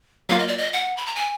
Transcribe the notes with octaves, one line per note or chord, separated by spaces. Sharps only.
F#3 A#3 F4 F5
D#5
D5
D#5
F#5
B5
A#5
G#5